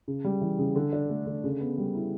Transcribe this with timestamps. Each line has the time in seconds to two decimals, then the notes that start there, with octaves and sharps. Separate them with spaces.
0.08 C#3
0.24 G3
0.41 E3
0.59 C#3
0.75 D3
0.93 D4
1.10 A3
1.26 D3
1.44 C#3
1.61 B3
1.78 G3
1.95 E4